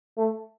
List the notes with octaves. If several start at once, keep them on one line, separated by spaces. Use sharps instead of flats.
A3